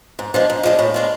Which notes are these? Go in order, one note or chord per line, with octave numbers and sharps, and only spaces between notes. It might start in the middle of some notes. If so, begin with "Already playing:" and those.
G#2
F3 G#3 D4
G#2
F3 G#3 D4
A2
G#3 D4 F4